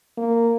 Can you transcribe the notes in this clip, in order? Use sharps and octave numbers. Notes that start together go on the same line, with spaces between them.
A#3